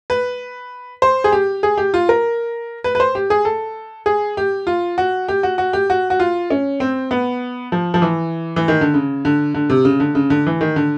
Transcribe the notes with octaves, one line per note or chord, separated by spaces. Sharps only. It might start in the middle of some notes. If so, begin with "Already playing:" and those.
B4
C5
G#4
G4
G#4
G4
F4
A#4
B4
B4
C5
G4
G#4
A4
G#4
G4
F4
F#4
G4
F#4
F#4
G4
F#4
F#4
F4
C#4
C4
B3
F3
F3
E3
E3
D#3
D3
C#3
D3
D3
C3
C#3
D3
C#3
D3
E3
D#3
D3